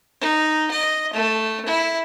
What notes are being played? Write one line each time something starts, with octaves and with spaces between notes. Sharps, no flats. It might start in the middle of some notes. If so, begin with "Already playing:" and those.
D#4
D#5
A3
E4